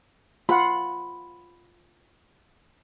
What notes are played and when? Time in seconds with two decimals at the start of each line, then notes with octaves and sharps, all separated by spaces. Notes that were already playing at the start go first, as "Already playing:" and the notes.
0.49 F4 F#5 B5